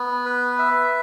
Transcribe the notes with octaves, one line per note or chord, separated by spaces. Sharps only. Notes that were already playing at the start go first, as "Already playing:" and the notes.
Already playing: B3
B4
E5